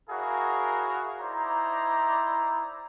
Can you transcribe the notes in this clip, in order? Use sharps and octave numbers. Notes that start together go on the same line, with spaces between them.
E4 F#4 G#4 A#4 C#5 F5
D#4 E4 C5 D5 A#5